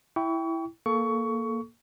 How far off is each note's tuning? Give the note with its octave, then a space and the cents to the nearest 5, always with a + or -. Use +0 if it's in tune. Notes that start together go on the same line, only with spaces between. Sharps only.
E4 +0 G5 +0 C#6 +35
A#3 +0 A4 -15 C#6 +20